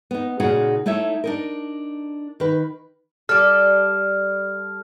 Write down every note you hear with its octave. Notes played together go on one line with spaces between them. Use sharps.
B3 D#4
A#2 C#3 D#4 F#4 G#4 F#5
A3 D#4 E4 C#5 E5
D4 D#4 A#4
D#3 B4
G3 A4 F6